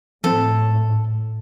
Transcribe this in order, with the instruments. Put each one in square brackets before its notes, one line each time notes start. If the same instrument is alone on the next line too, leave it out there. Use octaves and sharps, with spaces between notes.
[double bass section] A2 [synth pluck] F3 C4 [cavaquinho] A4